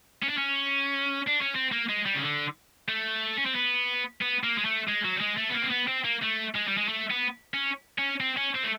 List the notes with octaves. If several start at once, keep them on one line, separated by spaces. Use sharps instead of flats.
C#4
D4
C#4
D4
C#4
C4
A#3
G#3
G3
C#3
D3
A3
C#4
C4
B3
B3
A#3
G#3
A3
G#3
F#3
G3
G#3
A3
B3
A#3
C4
B3
C4
A#3
A3
G#3
G3
G#3
A3
B3
C#4
C#4
C4
C#4
C4
A3